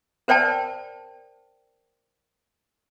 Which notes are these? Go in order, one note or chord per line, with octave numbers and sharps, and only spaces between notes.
A#4 C5 D5 G5 A5